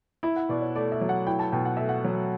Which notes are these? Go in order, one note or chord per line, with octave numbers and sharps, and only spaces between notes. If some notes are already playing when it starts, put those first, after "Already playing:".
E4 E5
F#5
B2 D5
C#5
A3 D5
E5
F#3
F#5
E4 G5
A5
B2 G5
F#5
A3 E5
F#5
F#3